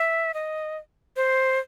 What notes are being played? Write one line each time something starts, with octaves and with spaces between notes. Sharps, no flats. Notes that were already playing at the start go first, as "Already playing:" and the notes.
Already playing: E5
D#5
C5